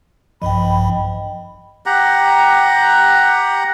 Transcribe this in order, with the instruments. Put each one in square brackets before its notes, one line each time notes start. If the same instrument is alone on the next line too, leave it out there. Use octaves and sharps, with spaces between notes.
[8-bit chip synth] A#1 G2 F3 [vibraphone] D#5 G5 [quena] B5
[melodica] G4 F#5 A#5